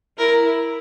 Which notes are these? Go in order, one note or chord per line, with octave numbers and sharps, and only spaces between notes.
E4 A#4